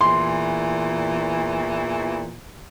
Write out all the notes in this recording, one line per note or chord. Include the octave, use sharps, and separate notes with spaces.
E2 A#2 E3 C6